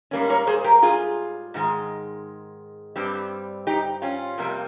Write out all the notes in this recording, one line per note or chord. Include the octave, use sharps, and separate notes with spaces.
G#2 G3 A#3 C#4
A#4 C#5
G#4 C5
G4 A#4
F4 G#4
G#2 D#3 G#3
G2 G3 C4
D#4 G4
C#4 F4
F2 C3 G3 A#3